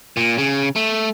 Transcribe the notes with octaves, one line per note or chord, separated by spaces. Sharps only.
A#2
C#3
A3